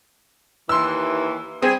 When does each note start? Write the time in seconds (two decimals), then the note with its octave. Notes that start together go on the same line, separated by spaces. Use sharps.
0.69 D#2 E3 C6 E6
1.62 G3 C4 G#4